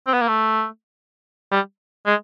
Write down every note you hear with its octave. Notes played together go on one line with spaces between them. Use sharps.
C4
B3
A#3
A3
G3
G#3